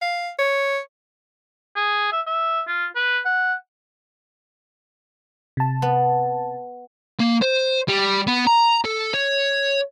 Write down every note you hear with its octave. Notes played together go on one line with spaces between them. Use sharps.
F5
C#5
G#4
E5
E5
F4
B4
F#5
C3 A5
B3
A#3
C5
G3
B3
A#5
A4
C#5